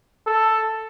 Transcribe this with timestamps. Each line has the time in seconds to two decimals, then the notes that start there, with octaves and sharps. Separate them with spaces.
0.27 A4